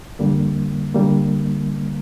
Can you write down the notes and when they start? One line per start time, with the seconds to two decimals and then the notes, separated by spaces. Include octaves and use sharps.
0.19 F2 D3 G3 A#3
0.95 D3 G3 A#3